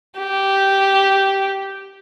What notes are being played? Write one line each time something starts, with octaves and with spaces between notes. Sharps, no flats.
G4